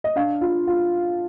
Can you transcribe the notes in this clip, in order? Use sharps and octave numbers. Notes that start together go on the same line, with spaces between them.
D#5
D4 F5
F4
F4